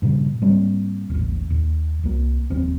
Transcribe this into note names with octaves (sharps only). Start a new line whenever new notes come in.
G2 A#2 C#3
G#2 G3 A#3 C4
D#1 A1
D#2
C2 A#3
F1 D#2 C4